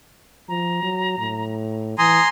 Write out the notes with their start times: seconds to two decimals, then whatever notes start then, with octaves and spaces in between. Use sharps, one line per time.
0.49 F3 A#5
0.83 F#3
1.18 A2
1.98 E3 G#5 A#5 C6 D#6